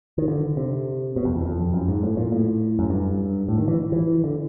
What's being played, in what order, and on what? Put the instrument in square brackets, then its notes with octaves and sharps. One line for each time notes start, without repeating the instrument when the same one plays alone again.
[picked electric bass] D#3
D3
C3
B2
F2
E2
F2
F#2
G#2
A2
A#2
A2
F#2
G2
A2
D#3
E3
E3
D3